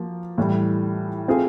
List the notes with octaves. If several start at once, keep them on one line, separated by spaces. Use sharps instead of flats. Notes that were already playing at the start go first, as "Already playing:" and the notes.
Already playing: F3 A#3 F#4
A2 E3 G3
A3 C4 F4 G#4